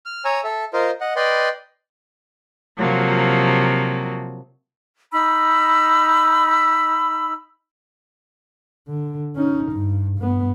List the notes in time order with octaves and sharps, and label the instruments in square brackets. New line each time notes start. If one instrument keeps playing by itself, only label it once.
[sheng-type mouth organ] F6
C#5 G#5 A#5 E6
A4 E5
F4 A#4 C5 D#5
D#5 F#5
B4 D5 D#5 G5 B5 C6
[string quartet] C3 F3 F#3 A#3
[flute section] D#4 B5 E6
[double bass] D3
C#4 D#4
G2
G2 B3